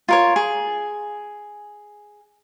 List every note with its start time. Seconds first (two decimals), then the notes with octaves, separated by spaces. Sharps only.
0.09 F4 A#4 C#5
0.36 G#4